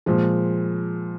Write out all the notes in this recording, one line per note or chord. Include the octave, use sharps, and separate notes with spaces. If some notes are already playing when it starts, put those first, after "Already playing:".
A#2 F3 G#3